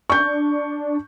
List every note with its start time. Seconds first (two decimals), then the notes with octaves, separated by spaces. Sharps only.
0.10 D4 C#6 G6